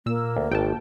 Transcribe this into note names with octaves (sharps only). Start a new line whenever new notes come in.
A#2 A#3 E6
D2
G#1 G5 A5